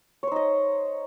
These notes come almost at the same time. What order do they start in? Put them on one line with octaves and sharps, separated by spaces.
C#5 C5 D#4 D#5